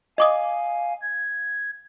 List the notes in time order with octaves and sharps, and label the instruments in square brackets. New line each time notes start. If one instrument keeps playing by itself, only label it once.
[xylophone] D#5 D6 D#6 [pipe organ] F5 G#5
[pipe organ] G#6